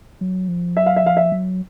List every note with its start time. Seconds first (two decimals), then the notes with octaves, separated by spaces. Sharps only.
0.21 F#3
0.48 F3
0.77 F#3 E5
0.86 F5
0.96 E5
1.04 F3 F5
1.17 E5
1.32 F#3